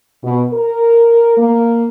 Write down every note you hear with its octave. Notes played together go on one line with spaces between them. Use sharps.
B2
A#4
A#3